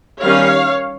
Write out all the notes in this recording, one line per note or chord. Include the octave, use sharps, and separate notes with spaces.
D#3 G3 C#4 C#5 F5